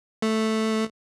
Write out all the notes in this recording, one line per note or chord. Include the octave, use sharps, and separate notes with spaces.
A3